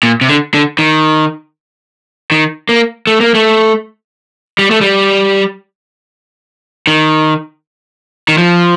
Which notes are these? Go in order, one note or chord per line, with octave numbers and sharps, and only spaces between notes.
A#2
C3
D3
D3
D#3
D#3
A#3
A3
A#3
A3
G3
A3
G3
D#3
D#3
F3